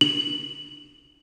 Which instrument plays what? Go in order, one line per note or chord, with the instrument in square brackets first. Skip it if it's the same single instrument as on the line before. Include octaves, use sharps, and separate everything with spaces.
[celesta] F#7